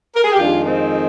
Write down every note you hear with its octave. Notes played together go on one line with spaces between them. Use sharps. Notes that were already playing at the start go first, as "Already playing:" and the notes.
A#4
G#4
G4
F2 D#3 G#3 D4 F4
C4 D#4